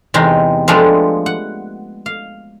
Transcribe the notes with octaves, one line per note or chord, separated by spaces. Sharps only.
E2 C3 G#3 D#4 F5
F3 G#3 A3 B3 D4 G4
F#5
F5